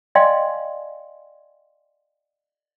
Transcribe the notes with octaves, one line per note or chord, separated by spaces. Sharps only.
D5 D#5 F5 G5 G#5 C6